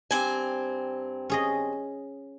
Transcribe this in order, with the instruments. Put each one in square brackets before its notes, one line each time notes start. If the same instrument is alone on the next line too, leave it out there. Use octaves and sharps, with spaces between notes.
[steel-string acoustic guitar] G2 C4 G#5
[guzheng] C#4 G#4 D#5